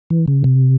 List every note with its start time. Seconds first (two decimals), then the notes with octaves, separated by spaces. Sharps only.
0.10 E3
0.28 C#3
0.44 C3